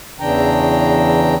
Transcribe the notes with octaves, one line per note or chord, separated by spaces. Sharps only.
E2 C#3 E3 D4 G5 A#5